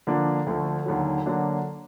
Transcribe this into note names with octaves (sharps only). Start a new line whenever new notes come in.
D3 F3 A#3 D4
D2 D3 F3 A3
D#2 D3 F#3
D3 F#3 A#3 D4